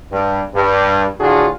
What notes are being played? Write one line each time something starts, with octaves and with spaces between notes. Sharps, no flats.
G2
G2
D2 A2 D4 F4 F#4 G#4